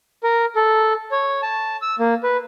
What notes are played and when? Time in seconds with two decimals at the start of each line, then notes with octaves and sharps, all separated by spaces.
0.24 A#4
0.56 A4
1.12 C#5
1.42 A5
1.82 E6
1.99 A#3
2.23 B4